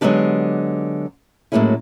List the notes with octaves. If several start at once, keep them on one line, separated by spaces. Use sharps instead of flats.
D3 F#3 G#3 B3 D4 G4
A2 F#3 G#3 A#3 C#4 E4